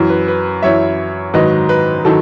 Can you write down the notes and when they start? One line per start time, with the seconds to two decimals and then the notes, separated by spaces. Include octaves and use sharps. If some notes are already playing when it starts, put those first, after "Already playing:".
Already playing: F#2 E3
0.10 B4
0.28 B4
0.62 F#2 E3 C#5 E5
1.34 G#2 D#3 F#3 B4 D#5
1.69 B4
2.05 D#3 F#3 A4